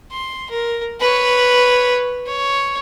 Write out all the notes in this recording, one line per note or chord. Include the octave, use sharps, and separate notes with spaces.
C6
A#4
B4 C#5
C#5